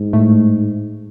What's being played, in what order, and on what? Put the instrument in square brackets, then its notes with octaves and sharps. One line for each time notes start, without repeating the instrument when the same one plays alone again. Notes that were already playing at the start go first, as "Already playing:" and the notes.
Already playing: [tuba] G#2
[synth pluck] A2 A3